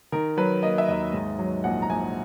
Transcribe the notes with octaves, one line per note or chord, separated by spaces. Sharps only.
D#3 A#4
F#3 B4
A#3 D#5
E5
D#2 D#5
G#2
F#3
A#1 F#5
A#5
A#1 G#5